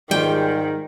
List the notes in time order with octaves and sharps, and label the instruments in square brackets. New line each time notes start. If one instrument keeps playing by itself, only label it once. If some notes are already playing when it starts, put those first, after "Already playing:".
[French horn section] G#2 [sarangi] D#3 [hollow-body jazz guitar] G3 F4 [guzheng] G5